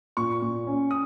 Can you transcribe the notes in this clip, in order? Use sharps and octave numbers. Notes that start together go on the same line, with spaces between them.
A#2 C#6
A#2
C#4
D#6